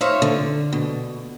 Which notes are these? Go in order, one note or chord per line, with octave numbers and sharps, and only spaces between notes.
D#4 C5 C#5 E5 F5
D3
B2